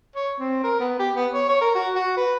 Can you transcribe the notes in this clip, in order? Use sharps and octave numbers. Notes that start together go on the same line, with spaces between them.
C#5
C4
A#4
B3
G4
B3
C#5
C#5
A#4
F#4
F#4
B4